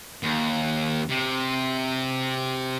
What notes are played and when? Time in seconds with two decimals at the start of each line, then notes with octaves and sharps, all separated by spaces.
0.23 D#2
1.10 C3